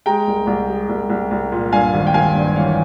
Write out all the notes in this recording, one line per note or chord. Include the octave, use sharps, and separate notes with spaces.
G#3 G5 A#5
C2
C2
G#3
C2
C2
C2
A#2
G2 F5 G#5
G#1
G5
G#1 F5 G#5
G2
E3 C#5 F5